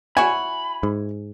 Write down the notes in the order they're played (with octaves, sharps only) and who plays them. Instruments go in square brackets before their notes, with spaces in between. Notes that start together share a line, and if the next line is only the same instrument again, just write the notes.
[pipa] E4 F#4 C#5 [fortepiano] G#5 [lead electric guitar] B5
[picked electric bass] G#2